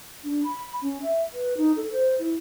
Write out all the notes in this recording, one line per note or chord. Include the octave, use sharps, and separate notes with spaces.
D4
B5
C#4
E5
B4
D#4
A4
C5
E4